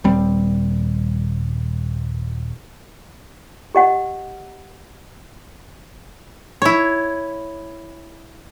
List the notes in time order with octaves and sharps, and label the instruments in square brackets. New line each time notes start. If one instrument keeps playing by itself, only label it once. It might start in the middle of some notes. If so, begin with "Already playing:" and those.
[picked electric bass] D#1 G3 C4
[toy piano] G4 D#5 F#5
[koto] E4 C#5